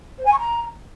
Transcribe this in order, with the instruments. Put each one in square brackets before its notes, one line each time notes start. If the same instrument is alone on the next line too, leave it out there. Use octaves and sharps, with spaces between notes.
[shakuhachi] C5
G#5
C#6
A#5